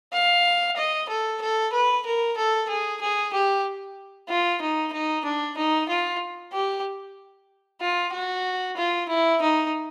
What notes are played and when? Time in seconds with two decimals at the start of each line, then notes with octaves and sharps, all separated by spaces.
0.13 F5
0.77 D#5
1.09 A4
1.41 A4
1.73 B4
2.06 A#4
2.37 A4
2.69 G#4
3.01 G#4
3.33 G4
4.29 F4
4.62 D#4
4.93 D#4
5.25 D4
5.57 D#4
5.89 F4
6.53 G4
7.81 F4
8.13 F#4
8.77 F4
9.09 E4
9.42 D#4